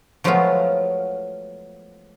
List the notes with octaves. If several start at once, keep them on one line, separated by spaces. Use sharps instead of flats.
F3 F#3 G#3 A3 B3 F4